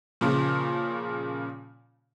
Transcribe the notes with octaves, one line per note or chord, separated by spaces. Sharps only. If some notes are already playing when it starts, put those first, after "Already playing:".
A#2 C#3 F3